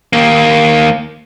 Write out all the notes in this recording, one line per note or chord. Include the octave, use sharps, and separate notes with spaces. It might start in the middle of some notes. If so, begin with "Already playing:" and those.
D#2 A#3